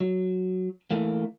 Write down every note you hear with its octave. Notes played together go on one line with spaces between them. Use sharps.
F#3
E3 A3 A#3